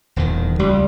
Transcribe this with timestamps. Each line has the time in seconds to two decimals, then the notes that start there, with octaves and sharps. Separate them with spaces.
0.16 D#1 E2 D#3
0.59 C#2 G3